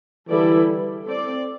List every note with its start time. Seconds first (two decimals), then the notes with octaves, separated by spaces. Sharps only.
0.29 D3 E3 G3 E4 A4 D5
1.05 C4 A4 D5